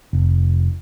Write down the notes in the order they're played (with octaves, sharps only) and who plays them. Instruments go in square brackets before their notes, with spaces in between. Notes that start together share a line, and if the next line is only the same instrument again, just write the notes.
[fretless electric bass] F1